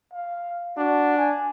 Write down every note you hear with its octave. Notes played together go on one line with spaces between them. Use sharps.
F5
D4 F#4
G#5